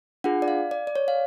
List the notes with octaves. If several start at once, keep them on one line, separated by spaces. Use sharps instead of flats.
D4 F4 G#4 F#5
D5
F5
D5
D5
C#5
F5